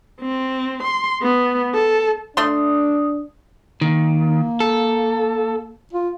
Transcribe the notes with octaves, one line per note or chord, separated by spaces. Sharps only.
C4
C6
B3
A4
A3 D4 C6 D#6
D#3 A#3
A4
F4